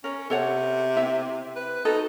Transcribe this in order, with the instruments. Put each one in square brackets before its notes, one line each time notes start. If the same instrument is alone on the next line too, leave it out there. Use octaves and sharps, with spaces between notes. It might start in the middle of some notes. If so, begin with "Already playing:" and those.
[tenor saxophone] C#4 [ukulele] A#4
[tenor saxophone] C3 [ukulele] A4 C#5 F#5
[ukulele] E4 G4 E5
[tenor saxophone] B4
[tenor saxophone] D#4 [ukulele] F#4 A4